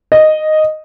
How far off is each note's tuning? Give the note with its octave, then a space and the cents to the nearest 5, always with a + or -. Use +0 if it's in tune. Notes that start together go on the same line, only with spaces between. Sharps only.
D#5 -5